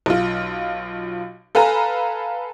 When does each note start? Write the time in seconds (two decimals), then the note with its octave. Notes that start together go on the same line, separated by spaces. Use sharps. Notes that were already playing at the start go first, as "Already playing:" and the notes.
0.06 B1 F4
1.55 A4 B4 F5 G#5 A#5